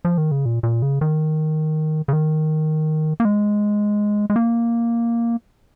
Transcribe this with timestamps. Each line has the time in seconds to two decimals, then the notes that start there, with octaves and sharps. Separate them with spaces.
0.05 F3
0.18 D#3
0.31 C#3
0.45 A#2
0.63 A#2
0.82 C#3
1.01 D#3
2.08 C#3
2.13 D#3
3.20 A#3
3.25 G#3
4.30 G#3
4.36 A#3